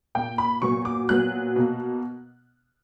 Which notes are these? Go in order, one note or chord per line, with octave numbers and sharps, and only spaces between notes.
A#2 A#3 G5
B5
A#2 F#3 B3 C#6
D6
A#2 F#3 B3 F#6
B2 A#3